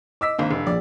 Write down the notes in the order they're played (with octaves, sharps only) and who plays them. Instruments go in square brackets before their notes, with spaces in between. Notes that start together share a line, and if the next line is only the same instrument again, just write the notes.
[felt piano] D#5 [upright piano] D6 E6 B6
[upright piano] G#1 A#3 [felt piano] D4 F5
[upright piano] F1
[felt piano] A#1 [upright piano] D5